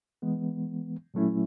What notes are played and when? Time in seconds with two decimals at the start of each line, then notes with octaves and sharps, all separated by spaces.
0.22 E3 G#3 B3
1.14 A#2 F#3 A3 C#4 E4